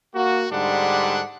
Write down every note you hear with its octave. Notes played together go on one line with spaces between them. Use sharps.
A#3 F#4
G#2 D3 G3 D4 F#5